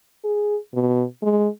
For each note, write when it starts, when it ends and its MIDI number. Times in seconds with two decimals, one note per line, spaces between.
0.24 0.57 68
0.74 1.04 47
1.23 1.48 56